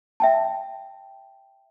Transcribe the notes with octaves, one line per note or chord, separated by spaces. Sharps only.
E5 G5 A5